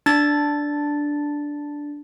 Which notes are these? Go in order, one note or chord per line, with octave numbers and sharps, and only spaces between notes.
D4 A6